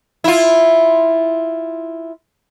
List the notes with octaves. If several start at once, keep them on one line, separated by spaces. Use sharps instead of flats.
E4 F4